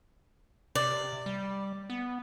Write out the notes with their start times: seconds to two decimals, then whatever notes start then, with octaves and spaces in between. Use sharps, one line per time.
0.75 C3 D5
1.26 G3
1.90 B3